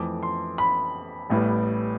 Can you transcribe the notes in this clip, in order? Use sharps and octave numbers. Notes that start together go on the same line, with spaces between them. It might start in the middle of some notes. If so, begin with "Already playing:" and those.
Already playing: F2 E3 A3 D6
C6
B5
A1 A2 G3 B3